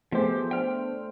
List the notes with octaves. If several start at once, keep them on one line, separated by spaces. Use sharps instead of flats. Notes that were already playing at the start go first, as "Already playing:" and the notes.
F3 A3 B3 G4 G#4 C5
D4 G5 F6